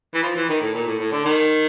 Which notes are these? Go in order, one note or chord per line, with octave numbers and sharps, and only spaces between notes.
E3
F3
E3
D#3
A2
A#2
A2
A2
D3
D#3